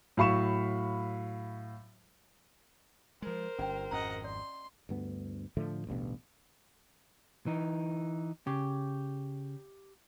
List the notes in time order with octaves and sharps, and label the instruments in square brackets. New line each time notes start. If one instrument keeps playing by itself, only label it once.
[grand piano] A2 F#3 F5 B5 C#6 E7
[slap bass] F3 G#3 [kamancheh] A#4 C5
[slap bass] G1 [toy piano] C#4 G5
[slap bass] G#1 F2 [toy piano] C#4 A#5 [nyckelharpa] D#5 F#5
[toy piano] D5 [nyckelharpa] C6
[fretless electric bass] D2 G2 B3
A2 D3 F3 A3
A1 D2 G2 B2
[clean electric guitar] E3 D#4
[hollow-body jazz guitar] C#3 [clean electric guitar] G4